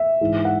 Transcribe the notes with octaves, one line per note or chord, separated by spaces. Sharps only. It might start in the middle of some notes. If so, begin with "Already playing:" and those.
Already playing: E5
G#2 E3 G#3
F#5